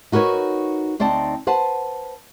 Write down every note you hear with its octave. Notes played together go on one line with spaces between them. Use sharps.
D#4 F#4 A#4 B4 C#5
D2 C4 D#4 D5 A5
B4 C5 F#5 A5